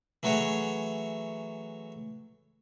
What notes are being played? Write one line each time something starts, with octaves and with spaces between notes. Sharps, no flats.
E3 F#3 A3 F#4 G#4 C#5